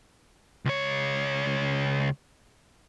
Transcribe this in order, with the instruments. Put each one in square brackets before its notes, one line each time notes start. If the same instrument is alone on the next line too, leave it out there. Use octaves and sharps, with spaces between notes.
[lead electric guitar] C#2 C#5